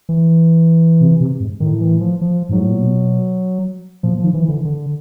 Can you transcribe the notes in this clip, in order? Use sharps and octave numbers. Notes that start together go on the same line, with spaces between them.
E3
C3
C3
G#2
A2 D#3
E3
F3
F3
G#2 F#3
A2
A#2
B2
A#2 F3
D#3 F3
E3
E3
D3
D3